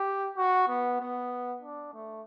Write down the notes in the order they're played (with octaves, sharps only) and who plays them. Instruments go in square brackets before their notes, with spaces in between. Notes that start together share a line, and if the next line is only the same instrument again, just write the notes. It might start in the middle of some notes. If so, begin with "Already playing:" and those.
Already playing: [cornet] G4
F#4
B3
B3
D4
A3